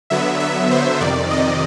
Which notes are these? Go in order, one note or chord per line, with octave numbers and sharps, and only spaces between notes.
D3 F#3 B3 E5
E5
C5
F2 C3 D#3 D5
D#5